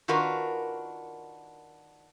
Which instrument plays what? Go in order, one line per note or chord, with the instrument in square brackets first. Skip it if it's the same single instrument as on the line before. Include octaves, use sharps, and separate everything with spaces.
[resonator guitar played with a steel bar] D#3 D4 F4 F#4 A#4 B4